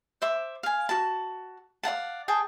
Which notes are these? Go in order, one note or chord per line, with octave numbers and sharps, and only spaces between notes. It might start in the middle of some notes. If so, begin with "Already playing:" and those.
C5 E5 D6
F5 G#5
F#4 A5
D5 F5 F#5 A5
G#4 G5 A5